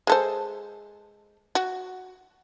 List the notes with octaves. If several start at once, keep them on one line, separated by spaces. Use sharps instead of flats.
G#3 A4 C5
F#4